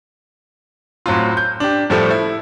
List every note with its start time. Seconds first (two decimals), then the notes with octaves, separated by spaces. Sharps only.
1.06 A2 F#3 C4 F4
1.37 G6
1.60 D4 G4
1.90 A2 F3 G3 A3 A4
2.10 E4